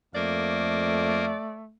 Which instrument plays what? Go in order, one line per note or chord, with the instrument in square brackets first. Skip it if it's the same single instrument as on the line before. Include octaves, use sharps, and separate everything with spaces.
[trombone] F2 [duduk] A3 [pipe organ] A#3 A#4 [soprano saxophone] D5